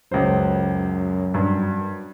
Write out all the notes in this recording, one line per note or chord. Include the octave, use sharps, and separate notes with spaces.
C#2 F#2 C5
G2